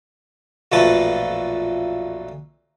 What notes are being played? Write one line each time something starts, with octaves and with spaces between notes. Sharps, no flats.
B1 F2 A#2 A3 B4 A5